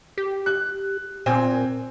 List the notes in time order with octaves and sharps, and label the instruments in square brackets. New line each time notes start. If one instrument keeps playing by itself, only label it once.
[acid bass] G4
[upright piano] F#6
[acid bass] A#2 [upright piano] C4 G#5